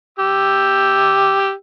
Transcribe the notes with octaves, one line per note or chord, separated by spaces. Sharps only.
G4 E6